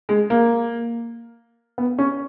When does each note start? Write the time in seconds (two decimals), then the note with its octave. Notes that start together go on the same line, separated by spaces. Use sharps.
0.09 G#3
0.30 A#3
1.78 B3
1.98 C#4